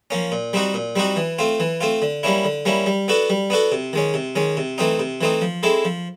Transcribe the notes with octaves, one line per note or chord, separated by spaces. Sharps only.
F3 A#3 C#4
A#2
G3 C4 D#4 F#4
A#2
G3 C4 D#4 F#4
E3
A3 C4 F4
E3
A3 C4 F4
D3
G3 A#3 C#4 E4
D3
G3 A#3 C#4 E4
G3
B3 D4 F#4 A4
G3
B3 D4 F#4 A4
C3
D#3 G#3 C#4
C3
D#3 G#3 C#4
C3
E3 A3 C4 D#4
C3
E3 A3 C4 D#4
F3
G#3 C4 E4 A4
F3